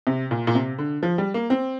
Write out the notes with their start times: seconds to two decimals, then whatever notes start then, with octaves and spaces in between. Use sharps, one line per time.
0.07 C3
0.31 A#2
0.47 A#2
0.55 C3
0.78 D3
1.03 F3
1.18 G3
1.34 A#3
1.50 C4